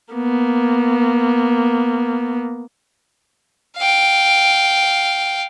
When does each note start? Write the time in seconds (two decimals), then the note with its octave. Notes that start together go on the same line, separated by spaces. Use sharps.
0.13 A#3 B3
3.77 F5 G5